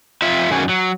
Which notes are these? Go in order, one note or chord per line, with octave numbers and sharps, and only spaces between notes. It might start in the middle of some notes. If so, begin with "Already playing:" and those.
F2 F4 E5
F#2 D#3 C#4 F#4 G#4
F#3